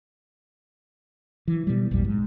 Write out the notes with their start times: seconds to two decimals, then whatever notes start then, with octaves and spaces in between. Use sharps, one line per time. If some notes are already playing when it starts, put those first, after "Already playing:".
1.48 E3
1.67 B2 G3
1.91 A#1 E2 G3
2.04 G#2